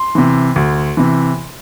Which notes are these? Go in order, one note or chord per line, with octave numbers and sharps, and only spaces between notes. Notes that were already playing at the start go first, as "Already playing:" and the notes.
Already playing: C6
C3 E3
D2
C3 E3